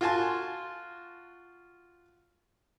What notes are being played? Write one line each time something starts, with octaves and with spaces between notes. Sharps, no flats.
F4 F#4 G#5 A5 C6